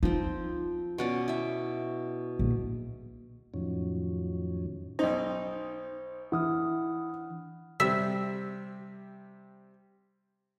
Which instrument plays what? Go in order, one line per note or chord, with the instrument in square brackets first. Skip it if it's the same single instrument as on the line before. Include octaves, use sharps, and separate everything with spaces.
[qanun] F3 C4 [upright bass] D#4
[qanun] B2 C#4 D5
E4 E5
[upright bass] A#1
[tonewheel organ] F2 A2 D#3 F3 F#3 C#4
[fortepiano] B1 D#4 [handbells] C5
[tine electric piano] E3 D4 [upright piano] E4 [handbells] F#5 D#6 F6
[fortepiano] C3 G3 [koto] E5